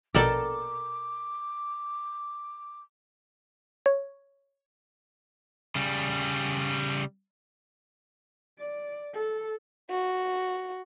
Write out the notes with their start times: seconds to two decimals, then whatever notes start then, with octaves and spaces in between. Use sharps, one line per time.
0.14 A#1 B2 A4 A#4 D5 G5 D6
3.86 C#5
5.75 C#3 G3
8.59 D5
9.13 A4
9.91 F#4